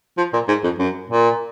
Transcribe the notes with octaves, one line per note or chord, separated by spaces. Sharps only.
F3
A#2
G#2
F2
F#2
A#2